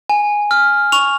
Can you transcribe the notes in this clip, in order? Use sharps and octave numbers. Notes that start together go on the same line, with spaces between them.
G#5
F6
C#6 F7